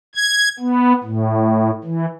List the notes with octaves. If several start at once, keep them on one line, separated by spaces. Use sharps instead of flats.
G#6
B3
A2
E3